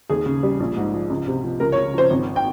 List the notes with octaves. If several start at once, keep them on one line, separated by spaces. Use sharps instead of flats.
D#2 G#4
C#3
G3
A#1
G#2
F3
C#2
C3
F3
C#2 A#4
C#5
C#3
F3 C5
G#1
G5